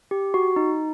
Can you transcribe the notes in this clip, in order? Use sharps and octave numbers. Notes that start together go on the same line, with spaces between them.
G4
F#4
D#4